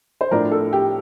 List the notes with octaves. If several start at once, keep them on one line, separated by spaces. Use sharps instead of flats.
C5
A2 F3 A3 D4 A#4
A4
G4